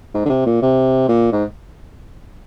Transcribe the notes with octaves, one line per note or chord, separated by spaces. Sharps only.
G#2
D3
C3
A#2
C3
A#2
G#2